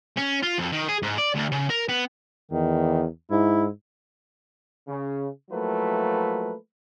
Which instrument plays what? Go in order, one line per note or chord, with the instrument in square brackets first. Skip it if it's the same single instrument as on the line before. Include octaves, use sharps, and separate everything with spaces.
[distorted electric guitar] C#4
F4
F2
D#3
G#4
G#2
D5
D2
C#3
A#4
B3
[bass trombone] E2 [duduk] D#3
[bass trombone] G#2 [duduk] E4
[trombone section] C#3
F3 F#3 A3 A#3 E4 B4